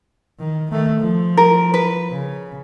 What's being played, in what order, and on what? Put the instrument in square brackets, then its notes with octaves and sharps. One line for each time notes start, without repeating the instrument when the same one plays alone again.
[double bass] D#3
D#3 A3
F3
[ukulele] A#4
B4
[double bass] C#3